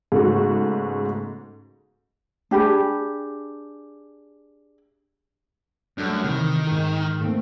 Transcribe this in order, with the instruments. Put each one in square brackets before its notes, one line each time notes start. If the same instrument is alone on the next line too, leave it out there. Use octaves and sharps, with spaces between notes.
[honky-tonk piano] G#2 C#3 A3 B3 F#4
[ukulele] D4 G4 G#4 B5
[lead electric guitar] F#2 [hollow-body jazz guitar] G3 A3 D4
[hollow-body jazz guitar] C3 E3 [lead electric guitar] D#3
[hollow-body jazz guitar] G#2 A#4
A3 A#3 C4